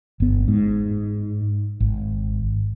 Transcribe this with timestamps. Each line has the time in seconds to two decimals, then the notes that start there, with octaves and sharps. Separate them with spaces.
0.20 G1 B3
0.48 G#2
1.80 G#1